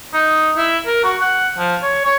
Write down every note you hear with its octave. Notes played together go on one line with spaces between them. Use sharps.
D#4
E4
A#4
F#4
F#5
F3
C#5
C#5